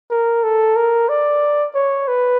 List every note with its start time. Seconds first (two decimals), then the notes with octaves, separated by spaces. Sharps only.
0.11 A#4
0.44 A4
0.76 A#4
1.09 D5
1.75 C#5
2.08 B4